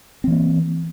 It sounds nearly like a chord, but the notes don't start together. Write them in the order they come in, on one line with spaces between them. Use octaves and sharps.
C4 E3 A#3